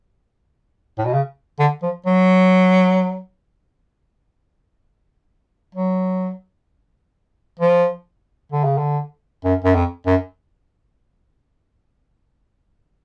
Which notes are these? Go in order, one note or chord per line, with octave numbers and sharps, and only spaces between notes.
A2
B2
C#3
D3
F3
F#3
F#3
F3
D3
C#3
D3
F#2
F#2
F2
F#2